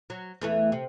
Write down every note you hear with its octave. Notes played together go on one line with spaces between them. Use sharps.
F#3
E2 E3 A3
C3